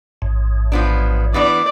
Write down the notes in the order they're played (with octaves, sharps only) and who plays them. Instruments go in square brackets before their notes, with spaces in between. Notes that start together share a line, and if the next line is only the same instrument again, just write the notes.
[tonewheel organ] A1 G#2
[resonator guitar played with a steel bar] F3 B3 D4
[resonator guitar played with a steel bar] E3 B3 D4 [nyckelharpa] D5